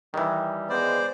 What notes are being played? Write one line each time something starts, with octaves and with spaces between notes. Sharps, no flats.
D#3 E3 G3
G#3 B3 C5 D5